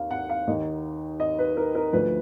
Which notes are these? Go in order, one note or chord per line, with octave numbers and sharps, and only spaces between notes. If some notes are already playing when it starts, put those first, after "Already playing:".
Already playing: D#2 F5
F#5
F5
D#2 D#3 D#5
D#5
B4
A#4
A#4
D2 D3 F3 B4